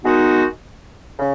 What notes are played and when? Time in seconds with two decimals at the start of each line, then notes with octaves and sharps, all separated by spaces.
0.04 D#3 G#3 B3 D#4 F#4
1.19 C#3